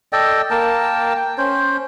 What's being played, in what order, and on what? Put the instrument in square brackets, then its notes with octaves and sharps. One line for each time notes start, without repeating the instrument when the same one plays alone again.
[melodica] A4 D5 D#5 G5
A#3 A#4 G5 A5
G5
C#4 C5